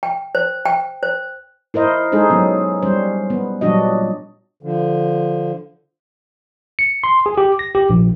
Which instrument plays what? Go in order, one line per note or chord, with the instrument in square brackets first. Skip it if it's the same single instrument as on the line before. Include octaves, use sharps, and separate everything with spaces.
[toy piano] G5
C5
G5
C5
[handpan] E4 A#4 C5 D#5
G#3 D#4 G#4 A4 C5
F#3 B3 C#4
G3 C#4 C5
B3
A#2 F#3 G3 D4 F#4 D#5
[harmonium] D3 F3
[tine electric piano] C#7
C6
G#4
G4
A#6
G4
A#1